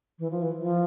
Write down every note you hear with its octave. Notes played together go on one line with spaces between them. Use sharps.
E3
F3
E3
F3